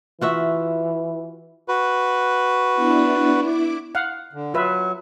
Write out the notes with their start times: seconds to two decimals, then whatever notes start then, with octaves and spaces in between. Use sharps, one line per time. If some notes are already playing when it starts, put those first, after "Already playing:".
0.21 E3 F4 F#4 E5
1.68 F#4 B4
2.74 B3 D4 E4
3.39 E4 D6
3.95 F5 F#5
4.33 D3
4.54 F#3 F4 B4 E5